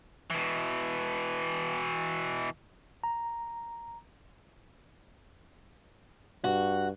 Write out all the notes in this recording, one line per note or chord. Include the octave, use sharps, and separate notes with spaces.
B2 E3
A#5
G2 F#4